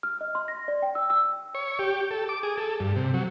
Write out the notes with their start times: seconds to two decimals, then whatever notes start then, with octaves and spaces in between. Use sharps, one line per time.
0.03 F6
0.21 D#5
0.35 C6
0.48 A#6
0.68 D5
0.82 G5
0.95 E6
1.10 E6
1.55 C#5
1.79 G4
2.11 A4
2.29 D6
2.43 G#4
2.58 A4
2.80 G2
2.96 C3
3.14 F#3